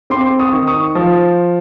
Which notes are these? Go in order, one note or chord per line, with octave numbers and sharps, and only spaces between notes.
C4 C6 D6
C#6 D#6
D#3
C#6 D#6
F3